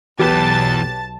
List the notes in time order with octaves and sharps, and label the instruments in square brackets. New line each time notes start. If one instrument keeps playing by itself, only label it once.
[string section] B1 A5 A6 [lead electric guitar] E2 [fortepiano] G4 B4